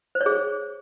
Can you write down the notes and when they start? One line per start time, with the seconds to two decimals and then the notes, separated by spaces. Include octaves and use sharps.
0.15 C5
0.21 C#5
0.26 G#4